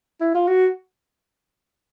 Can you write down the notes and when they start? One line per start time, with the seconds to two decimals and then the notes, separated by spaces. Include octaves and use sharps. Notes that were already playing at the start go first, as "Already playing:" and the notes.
0.21 E4
0.34 F4
0.48 F#4